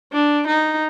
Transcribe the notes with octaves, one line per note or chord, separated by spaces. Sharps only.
D4
D#4